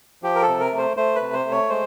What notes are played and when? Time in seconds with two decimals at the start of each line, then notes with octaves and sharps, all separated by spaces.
0.23 F3 G4
0.35 A#4
0.42 A4
0.48 C3
0.59 A#4
0.72 A3
0.78 C5
0.97 A3 C5
1.15 B4
1.21 C3
1.33 C5
1.45 A3
1.51 C#5
1.69 G#3 C5